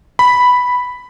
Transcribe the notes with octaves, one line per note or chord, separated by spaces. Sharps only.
B5